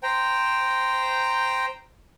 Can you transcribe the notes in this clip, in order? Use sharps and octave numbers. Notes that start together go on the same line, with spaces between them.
C5 G5 A#5